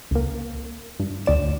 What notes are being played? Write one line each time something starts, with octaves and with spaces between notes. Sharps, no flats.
C#2 A#3
G2
D2 D5 E7